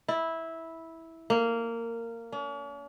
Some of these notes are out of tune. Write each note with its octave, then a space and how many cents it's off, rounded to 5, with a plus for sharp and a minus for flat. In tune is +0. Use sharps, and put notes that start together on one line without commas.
E4 -10
A#3 -15
C#4 +45